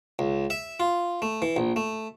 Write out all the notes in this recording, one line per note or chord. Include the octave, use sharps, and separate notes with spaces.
C#2
E5
F4
A3
E3
A#1
A3